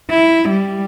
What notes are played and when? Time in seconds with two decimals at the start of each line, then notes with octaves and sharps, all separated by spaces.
0.11 E4
0.49 G3